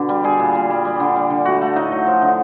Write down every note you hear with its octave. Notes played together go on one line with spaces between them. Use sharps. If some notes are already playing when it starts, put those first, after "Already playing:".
Already playing: B2 D3 D4
G3
G3 G#4
A#2
A#2
G3
G3
D3
G3
D3
A3 F#4
A3
A2 D#4
F#3
F3
D3